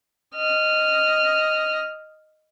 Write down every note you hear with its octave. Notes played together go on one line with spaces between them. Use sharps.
D#5 F6